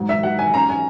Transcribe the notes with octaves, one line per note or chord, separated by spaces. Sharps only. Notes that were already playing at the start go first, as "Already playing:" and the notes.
Already playing: G#2 F#3
E5
F#3 F#5
G#5
C#4 A#5
G#5